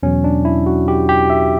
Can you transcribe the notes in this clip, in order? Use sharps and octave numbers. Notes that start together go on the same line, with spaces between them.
E2 B2 F#3 C#4
D4
E4
F#4
G4
G4
E5